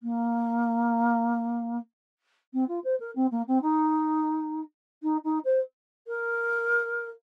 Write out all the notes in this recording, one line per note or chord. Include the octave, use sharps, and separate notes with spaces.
A#3
C4
F4
C5
A#4
C4
A#3
C4
D#4
D#4
D#4
C5
A#4